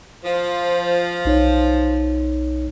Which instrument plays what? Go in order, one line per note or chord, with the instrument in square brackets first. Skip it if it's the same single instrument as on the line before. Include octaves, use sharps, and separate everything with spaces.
[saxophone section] F3
[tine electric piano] B1 D#4 C#5